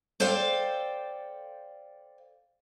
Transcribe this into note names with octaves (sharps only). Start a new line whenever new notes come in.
A4 C5 D5 F5 G5